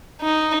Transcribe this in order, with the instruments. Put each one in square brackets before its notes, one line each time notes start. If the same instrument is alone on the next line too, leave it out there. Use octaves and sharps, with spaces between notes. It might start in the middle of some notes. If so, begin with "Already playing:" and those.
[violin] D#4